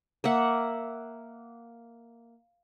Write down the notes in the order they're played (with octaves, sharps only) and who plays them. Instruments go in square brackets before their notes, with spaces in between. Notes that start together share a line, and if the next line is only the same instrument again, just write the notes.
[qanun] A#3 E5 F#5